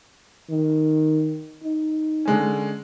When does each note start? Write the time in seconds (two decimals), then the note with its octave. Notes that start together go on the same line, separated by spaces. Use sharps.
0.50 D#3
1.64 D#4
2.26 D3 G#3 C#4